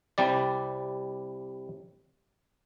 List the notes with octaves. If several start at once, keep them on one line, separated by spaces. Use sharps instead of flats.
C2 C3 G3 D5